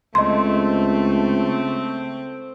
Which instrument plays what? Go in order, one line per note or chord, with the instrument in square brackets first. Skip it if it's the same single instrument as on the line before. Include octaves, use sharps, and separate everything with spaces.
[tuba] C#2 [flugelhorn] A3 [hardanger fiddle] C4 [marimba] D#5 C6